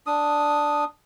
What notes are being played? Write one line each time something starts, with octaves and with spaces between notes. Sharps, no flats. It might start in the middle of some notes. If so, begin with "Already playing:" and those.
D4 D#6